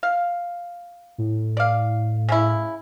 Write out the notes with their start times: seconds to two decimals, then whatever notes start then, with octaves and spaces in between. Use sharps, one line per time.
0.03 F5
1.18 A2
1.57 D5 F5
2.29 C#3 C#4 E4